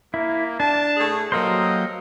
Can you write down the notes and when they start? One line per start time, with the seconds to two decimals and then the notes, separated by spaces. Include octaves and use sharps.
0.14 A#3 E4
0.60 D4 A5
0.96 A2 A3 G#4
1.32 F#3 A#3 G4 A4 A#4 C5 D#5